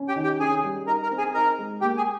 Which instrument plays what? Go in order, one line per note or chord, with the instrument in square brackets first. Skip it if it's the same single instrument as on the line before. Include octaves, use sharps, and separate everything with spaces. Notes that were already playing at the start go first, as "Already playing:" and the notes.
Already playing: [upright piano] C#4
[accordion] G4 G5
[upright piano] D#3
[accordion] G4 G5
[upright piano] C#4 [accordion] G#4 G#5
[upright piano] G3
[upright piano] D#4 [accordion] A#4 A#5
[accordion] A#4 A#5
[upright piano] C4
[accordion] G#4 G#5
[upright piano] D#4 [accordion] A#4 A#5
[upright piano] G#3
[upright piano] A#3 [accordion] G4 G5
[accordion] G#4 G#5